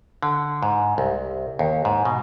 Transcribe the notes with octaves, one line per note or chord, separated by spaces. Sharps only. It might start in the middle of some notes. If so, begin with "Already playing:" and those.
D3
G#2
C2
D#2
G#2
B2